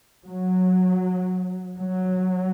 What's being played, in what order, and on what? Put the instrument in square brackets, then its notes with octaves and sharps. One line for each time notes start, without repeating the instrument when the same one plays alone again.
[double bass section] F#3
F#3